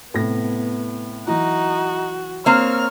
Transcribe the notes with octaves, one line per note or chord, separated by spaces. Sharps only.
A2 C3 B3 A#6
E3 F#3 D#4 E4 F#4
A#3 C4 C#5 F6